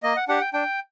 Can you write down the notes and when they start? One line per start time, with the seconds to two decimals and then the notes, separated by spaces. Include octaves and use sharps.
0.03 A#3 D#5
0.17 F#5
0.28 D4 G4 F#5
0.41 G5
0.53 D4 G5